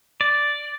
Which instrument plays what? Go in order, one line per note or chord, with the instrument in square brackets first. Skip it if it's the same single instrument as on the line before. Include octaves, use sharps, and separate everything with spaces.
[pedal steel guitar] D5